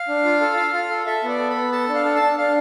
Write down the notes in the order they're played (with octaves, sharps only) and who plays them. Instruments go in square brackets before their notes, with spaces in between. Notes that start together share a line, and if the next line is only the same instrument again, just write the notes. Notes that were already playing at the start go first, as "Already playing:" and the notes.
Already playing: [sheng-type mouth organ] F5
D4
F4
A4
F4
F4
A4
A4 E5
B3 D5
A4
B5
B3
A4 A5
D4
F5
A4
A5
D4
D4 F5